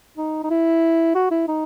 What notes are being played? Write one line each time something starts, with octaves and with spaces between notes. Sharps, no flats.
D#4
D#4
E4
F#4
E4
D#4